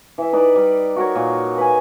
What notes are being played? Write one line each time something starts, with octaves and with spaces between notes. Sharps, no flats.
E3 E5
D#4 B4 D5 G5
G3
F#4 A#4 C#5
A#2
B4 G#5